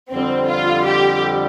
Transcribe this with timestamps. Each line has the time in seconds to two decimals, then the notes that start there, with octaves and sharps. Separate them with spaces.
0.11 F2 D3 G3 C4
0.49 F4
0.87 G4